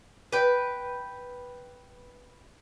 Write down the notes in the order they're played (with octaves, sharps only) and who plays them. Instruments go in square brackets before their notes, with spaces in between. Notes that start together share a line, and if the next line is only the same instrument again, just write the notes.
[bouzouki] B4 G5